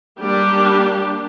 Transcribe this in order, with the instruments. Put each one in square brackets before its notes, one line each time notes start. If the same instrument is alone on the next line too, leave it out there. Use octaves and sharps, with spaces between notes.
[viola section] G3 A#3 D4 G4